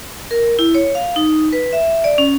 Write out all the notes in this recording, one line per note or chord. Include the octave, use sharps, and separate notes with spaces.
A#4
E4
C#5
F5
D#4
B4
E5
D5
C#4